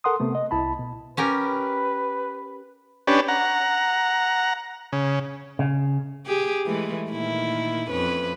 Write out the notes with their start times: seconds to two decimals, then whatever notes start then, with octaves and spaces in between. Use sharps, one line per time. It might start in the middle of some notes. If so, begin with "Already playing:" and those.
0.04 A4 A#4 F#5 C6 D#6
0.20 C3 A3 B3
0.35 D#5
0.51 C2 E4 A5 B5
0.79 B2
1.17 C#4 G4 A#4 B4
3.07 C#4 D4 G4 B4
3.28 F#5 A#5
4.92 C#3
5.59 C#3
6.26 G4 G#4
6.66 E3 G#3 A3
7.09 A#2 D#3 E4
7.90 F2 C#4 B4